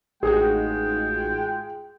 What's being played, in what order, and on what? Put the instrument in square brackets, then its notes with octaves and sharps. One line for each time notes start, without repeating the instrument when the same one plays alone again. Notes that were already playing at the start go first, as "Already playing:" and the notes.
[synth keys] A1 D#4 F#4 [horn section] G#3 F4 G5 [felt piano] G#4